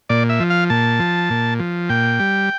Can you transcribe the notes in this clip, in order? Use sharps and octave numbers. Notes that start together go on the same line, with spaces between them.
A#2 D5
E5
F3
F5
A#2 A5
F3
A#2
F3
A#2 G5
G3